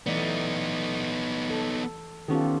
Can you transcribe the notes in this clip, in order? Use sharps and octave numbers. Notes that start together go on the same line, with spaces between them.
E3 A3 B3 D#4 D5
A4
D#3 B3 C#4 F4 G4 A4